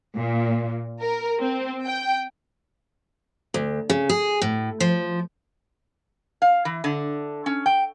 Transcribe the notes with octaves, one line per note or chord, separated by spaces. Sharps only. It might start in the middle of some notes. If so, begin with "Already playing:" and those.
A#2
A#4
C4
G5
D2
C#3
G#4
A2
F3
F5
E3
D3
C#4
G5